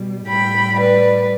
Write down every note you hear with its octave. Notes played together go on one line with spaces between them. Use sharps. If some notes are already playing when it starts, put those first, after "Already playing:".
Already playing: B2 G3
A2 G3 G5 B5
B4 D5